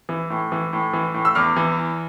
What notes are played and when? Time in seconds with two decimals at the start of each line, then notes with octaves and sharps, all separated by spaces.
0.09 E3
0.30 A2
0.52 E3
0.73 A2
0.93 E3
1.14 A2
1.25 E6
1.35 E2 D6 F6
1.56 E3